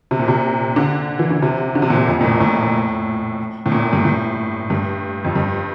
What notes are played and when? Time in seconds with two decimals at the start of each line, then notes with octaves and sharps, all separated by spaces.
0.11 C3
0.19 A#2
0.28 C3
0.76 D3
1.19 E3
1.30 D3
1.42 C3
1.75 D3
1.82 C3
1.90 A#2
1.97 C3
2.08 F2
2.21 A#2
2.25 A2
2.41 A2
3.66 A2
3.72 A#2
3.93 G2
4.05 A2
4.70 G2
5.24 F2
5.35 G2